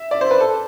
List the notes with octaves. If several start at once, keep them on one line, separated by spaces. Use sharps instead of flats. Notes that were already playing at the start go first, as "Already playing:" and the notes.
Already playing: E5
D5
C5
B4
A4